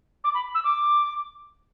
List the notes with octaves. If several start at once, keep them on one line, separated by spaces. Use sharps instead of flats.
D6
B5
E6
D6